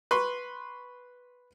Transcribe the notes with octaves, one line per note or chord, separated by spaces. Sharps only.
B4 C6 C#6